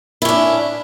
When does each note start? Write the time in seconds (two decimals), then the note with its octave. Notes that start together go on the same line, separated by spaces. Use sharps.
0.22 E4
0.25 C#4
0.29 D4